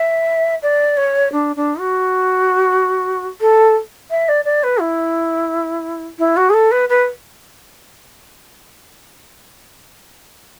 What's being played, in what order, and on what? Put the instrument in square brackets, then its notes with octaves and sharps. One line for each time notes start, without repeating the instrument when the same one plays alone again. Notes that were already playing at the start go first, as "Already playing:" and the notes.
Already playing: [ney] E5
D5
C#5
D4
D4
F#4
A4
E5
D5
D5
B4
E4
E4
F#4
G#4
A4
B4
B4